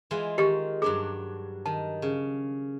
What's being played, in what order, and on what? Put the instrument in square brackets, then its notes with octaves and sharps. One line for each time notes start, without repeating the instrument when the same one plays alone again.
[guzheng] E3 G#3 F4
[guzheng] D#3 [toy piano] G4 D#5 C#6
[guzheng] G2 F#3 D4 [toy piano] G#4
[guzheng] D#3 [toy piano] A5
[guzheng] C#3